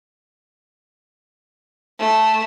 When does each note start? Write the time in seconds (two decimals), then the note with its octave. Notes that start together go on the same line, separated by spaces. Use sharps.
1.99 A3